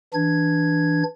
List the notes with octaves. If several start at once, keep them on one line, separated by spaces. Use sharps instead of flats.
E3 D4 G#6